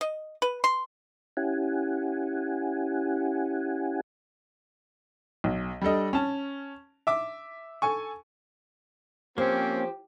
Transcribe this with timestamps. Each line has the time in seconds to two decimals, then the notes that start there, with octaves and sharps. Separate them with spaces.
0.01 D#5
0.42 B4
0.64 C6
1.37 C#4 E4 G4 F#5 G#5
5.44 B1
5.81 G3 D4 A4 D#5
6.13 C#4 A5
7.07 E5 D6
7.82 A4 G#5 C#6
9.38 F3 A#3 C4 C#4 G4